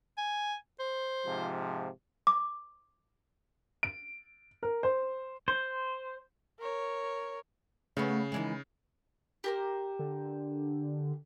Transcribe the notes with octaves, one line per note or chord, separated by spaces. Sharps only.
G#5
C5
G#2 C3 F3
D6
D7
A#4
C5
C5
A#4 C#5
C#3 A3 B3 C#4
D#3 E3 G#3
G4 A#4 C5
D3